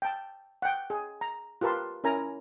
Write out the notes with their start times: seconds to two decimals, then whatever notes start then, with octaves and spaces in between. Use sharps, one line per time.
0.02 G5 A5
0.62 F#5 G5
0.90 G#4
1.21 A#5
1.61 F4 G4 A#4 B4 A5 C6
2.04 C#4 E4 A#4 G#5 A#5